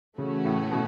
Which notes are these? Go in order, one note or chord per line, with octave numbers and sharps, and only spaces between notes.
C#3 E3 A3 C#4 F#4
A2
B2